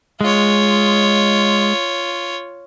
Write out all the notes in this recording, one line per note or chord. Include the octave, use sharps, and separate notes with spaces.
G#3 F4 C#5